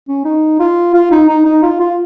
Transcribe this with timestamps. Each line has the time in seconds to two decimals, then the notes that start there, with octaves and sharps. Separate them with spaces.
0.08 C#4
0.25 D#4
0.59 F4
0.94 F4
1.12 D#4
1.29 D#4
1.45 D#4
1.63 F4
1.80 F4